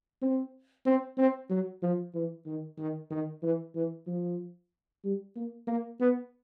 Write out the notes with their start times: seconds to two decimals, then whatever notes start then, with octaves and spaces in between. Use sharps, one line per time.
0.22 C4
0.85 C4
1.18 C4
1.50 F#3
1.82 F3
2.14 E3
2.46 D#3
2.78 D#3
3.11 D#3
3.43 E3
3.75 E3
4.07 F3
5.04 G3
5.35 A#3
5.67 A#3
6.00 B3